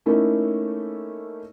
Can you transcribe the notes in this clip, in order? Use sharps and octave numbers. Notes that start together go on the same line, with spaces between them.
A3 A#3 C#4 D#4 E4 A4